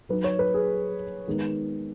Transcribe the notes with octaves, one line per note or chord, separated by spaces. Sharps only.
F#3 D#4 B4
C#5
B4
G#4
D#3 G#3 B3 D#4